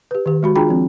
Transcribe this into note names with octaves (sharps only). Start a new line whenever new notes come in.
G4 B4
D#3 G4
G#3 F#4 B5
D4 F4 G#4 G5 A#5 B5
F3 C4